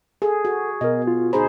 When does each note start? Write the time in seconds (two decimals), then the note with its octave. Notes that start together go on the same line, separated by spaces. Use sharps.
0.22 G#4 A4
0.45 F#4
0.81 B2 A#4 D#5
1.07 F4
1.33 D2 D#4 G#4 C5 A#5 B5